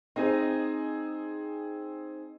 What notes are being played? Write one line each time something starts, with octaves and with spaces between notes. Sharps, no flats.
C4 D#4 G#4